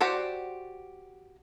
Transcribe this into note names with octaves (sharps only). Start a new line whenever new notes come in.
F#4 G4 C5 D5 F#5